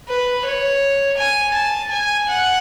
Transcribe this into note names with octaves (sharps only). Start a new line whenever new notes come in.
B4
C#5
G#5
A5
G#5
F#5